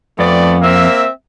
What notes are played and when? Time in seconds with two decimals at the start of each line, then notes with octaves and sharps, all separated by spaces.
0.19 F2 A3 B3 D5
0.62 A#3 C4 E5